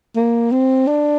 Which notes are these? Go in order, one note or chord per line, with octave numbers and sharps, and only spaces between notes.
A#3
C4
D4